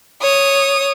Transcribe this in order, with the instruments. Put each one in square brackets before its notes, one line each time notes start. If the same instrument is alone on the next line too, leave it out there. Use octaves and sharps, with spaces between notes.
[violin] C#5 D#6